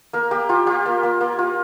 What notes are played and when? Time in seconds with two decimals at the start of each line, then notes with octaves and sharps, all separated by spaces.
0.13 A#3 A#4
0.31 A#3 G4
0.49 F4 G4
0.67 F4 G4
0.86 A#3
1.03 A#3
1.21 A#3
1.39 F4